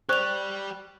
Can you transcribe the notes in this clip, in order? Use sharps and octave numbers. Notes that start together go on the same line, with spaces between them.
G4 C5 D5 C#6 F#6 F7